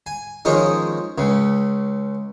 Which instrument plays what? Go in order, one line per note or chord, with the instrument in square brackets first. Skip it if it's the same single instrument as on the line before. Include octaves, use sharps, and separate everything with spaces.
[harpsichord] G#5
D#3 F3 G#3 C#4 D#4 D#5
C#2 C#3